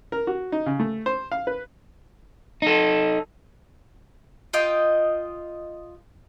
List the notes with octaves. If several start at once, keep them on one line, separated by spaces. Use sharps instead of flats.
A#4
F#4
D#4
C#3
A3
C5
F5
B4
D#4 A4
F4 D#5 G5